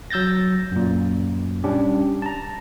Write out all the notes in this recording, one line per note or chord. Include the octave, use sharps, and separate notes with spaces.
F#3 E6 G6 A6 A#6
F#2 A#2
G3 C#4 D4 G4
A5 A#5